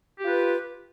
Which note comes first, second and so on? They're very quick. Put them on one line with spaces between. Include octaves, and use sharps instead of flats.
G4 F4 B4